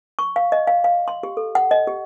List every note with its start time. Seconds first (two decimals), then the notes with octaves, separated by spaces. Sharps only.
0.19 C#6
0.36 F5
0.52 D#5
0.67 F5
0.84 F5
1.08 C6
1.23 G4
1.37 A4
1.55 F#5
1.71 D#5
1.87 G4